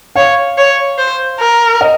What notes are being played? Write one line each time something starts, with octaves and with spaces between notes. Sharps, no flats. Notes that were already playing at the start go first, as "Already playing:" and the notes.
C#5 F5
C#5
C5
A#4
D#5